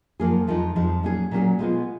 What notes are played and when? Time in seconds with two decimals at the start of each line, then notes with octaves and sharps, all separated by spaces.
0.20 F#2 F3 A#3 F4 G#4
0.47 F2 F3 G#3 D#4
0.75 F2 F3 G#3 D#4
1.03 A#2 F#3 C#4 G#4
1.31 A#2 F#3 C#4 G#4
1.59 B2 G#3 B3 F4 G#4